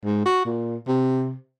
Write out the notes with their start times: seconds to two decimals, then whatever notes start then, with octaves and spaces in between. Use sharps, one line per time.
0.05 G#2
0.26 F#4
0.45 A#2
0.88 C3